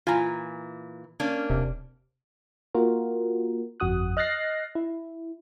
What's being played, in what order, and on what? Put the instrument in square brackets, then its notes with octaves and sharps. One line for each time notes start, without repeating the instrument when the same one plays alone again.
[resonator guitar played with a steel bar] A#2 E3 [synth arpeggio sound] F4 G#5 A#5
[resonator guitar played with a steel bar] A#3 C#4 D4
[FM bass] D#1 [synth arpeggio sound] C3
[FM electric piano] A#3 F4 F#4 A#4
G1 F2 F#4 D#6 F#6
D#5 F6 F#6 A6 A#6 C7
E4